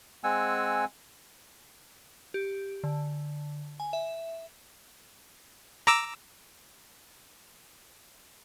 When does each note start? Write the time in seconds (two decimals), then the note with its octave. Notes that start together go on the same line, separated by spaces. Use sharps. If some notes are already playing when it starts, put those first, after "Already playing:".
0.24 G#3 C4 F#5 G#5 E6
2.34 G4
2.84 D3
3.80 G#5
3.93 E5
5.87 A#5 D6 E6